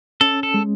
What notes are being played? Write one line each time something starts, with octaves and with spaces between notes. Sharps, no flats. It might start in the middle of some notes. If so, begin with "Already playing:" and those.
C#4 A4
A4
G#3